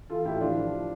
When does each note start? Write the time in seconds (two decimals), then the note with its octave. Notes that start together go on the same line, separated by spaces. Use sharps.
0.10 E3 F4 A4
0.25 A2 E4 G4
0.41 F3 D4 F4
0.57 F3